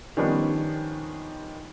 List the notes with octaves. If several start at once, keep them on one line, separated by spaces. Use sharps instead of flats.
D#3 F3 G3 B3 C#4 D4